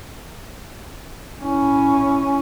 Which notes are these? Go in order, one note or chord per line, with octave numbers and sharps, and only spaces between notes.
C#4 E4